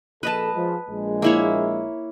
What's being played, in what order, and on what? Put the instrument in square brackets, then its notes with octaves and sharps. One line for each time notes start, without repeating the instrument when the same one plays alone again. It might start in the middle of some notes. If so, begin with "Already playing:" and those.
[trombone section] A#1 A4 [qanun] B4 D#5 A5
[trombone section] F3 G#3
A#1 G#3
[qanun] A#3 E4 C#5